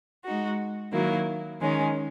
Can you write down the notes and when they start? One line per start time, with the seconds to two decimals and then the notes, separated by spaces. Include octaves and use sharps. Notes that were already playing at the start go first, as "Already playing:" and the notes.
0.24 G#3 D#4 F#4
0.92 D#3 F#3 A#3 E4
1.59 D#3 G#3 C#4